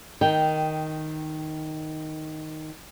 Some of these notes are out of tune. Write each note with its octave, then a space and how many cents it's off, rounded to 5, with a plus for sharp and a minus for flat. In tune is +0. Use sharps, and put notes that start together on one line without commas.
D#3 +0 G5 +0